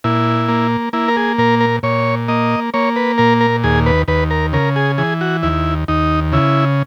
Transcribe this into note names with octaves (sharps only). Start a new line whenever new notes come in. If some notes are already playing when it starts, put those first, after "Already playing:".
A#2 E4
A#3
A#3 E4
A#4
G#4
A#2 A#4
A#4
A#2 C#5
A#3 D#5
A#3 C#5
B4
A#2 A#4
A#4
D#2 G#4
B4
D#2 B4
A#4
C#3 A#4
G#4
E3 G#4
F#4
D#2 E4
D#2 D#4
C#3 E4